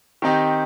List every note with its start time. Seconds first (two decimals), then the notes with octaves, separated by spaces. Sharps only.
0.22 D#3 C4 D#4 G4